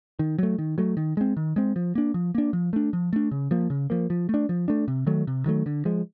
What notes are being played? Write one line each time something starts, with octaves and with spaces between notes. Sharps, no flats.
D#3
F#3 A3
D#3
F#3 A3
D#3
G#3 C4
D#3
G#3 C4
F3
A#3 D4
F3
A#3 D4
F3
A3 D4
F3
A3 D4
C#3
F3 A#3
C#3
F3 A#3
F3
A3 D4
F3
A3 D4
C3
D#3 F#3 A3
C3
D#3 F#3 A3
D3
F3 G#3